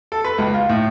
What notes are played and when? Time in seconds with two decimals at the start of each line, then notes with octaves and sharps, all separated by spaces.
0.12 A4
0.24 B4
0.38 C#2
0.54 F4
0.69 A2